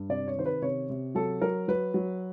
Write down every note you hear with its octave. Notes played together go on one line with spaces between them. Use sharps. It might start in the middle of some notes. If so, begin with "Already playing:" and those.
Already playing: G2
C3 D5
C#5
D#3 C5
B4
C3 C#5
C3
F#3 A4
F#3 A#4
F#3 B4
F#3